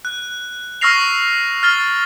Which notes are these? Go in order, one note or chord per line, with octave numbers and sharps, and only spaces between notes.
F#6
C#6 E6 F6 A#6 C7 F7
F6 A6 G7